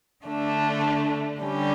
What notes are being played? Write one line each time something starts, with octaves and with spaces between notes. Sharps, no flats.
D3 A3 D4
D3 G3 C#4 G4